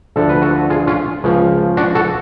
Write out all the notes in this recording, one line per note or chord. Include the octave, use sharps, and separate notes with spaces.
D2 D3 F3 A4
B4
F#4 A4
F4 G#4
C#4 F4
C#2 C#3 F3
D4 F#4
F#4 A4